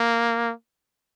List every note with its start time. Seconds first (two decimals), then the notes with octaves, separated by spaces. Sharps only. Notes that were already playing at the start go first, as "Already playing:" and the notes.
Already playing: A#3